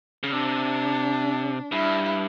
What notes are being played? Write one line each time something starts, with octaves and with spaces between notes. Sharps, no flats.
C#3
C3 D4
G2 E4